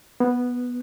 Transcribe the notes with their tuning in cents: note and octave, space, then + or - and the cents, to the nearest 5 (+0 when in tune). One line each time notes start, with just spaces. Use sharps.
B3 -5